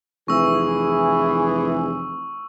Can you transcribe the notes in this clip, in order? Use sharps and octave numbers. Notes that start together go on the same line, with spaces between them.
F1 E3 G#4 C#6 E6